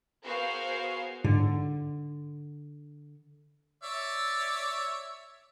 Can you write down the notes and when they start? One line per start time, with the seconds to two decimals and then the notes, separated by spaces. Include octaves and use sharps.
0.23 B3 F#4 G#4 A#4 C5 F5
1.24 G#2 D3
3.83 C#5 D5 E5